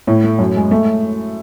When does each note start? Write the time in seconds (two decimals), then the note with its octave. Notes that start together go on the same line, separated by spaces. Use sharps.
0.07 A2 E4
0.24 A3
0.39 F#2
0.56 G#3
0.71 A3